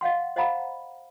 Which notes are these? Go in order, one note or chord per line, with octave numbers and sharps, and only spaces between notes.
D#5 F5 F#5 C6
C5 D#5 F5 F#5 A#5 B5